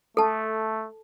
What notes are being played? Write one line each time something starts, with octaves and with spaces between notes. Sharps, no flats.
A3 A4 A5